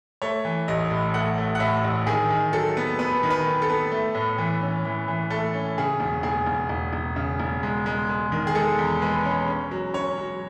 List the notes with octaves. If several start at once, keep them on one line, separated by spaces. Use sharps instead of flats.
A3 C#5
E3
A1 D#5
A2
A3 F#5
A3
F#5
A2 E5
A1
D#3 G#4
D#3
F#3 A4
B3
B3 B4
D#3
B4
D#3
A4
B3
A3
A2
E3
C#4
E3
E3
A3 A4
C#4
C#3 G#4
E1
E1 G#4
E1
E1
E1
C#3
E1
G#3
G#3
G#3
D#3
G#4
G#3 A4
E2
G#3 B4
C#4
C#4
F#3
C#4 C#5
F#3